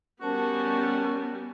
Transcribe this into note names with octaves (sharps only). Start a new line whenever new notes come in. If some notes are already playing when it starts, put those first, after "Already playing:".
G3 B3 C#4 F#4 A#4 C5 A5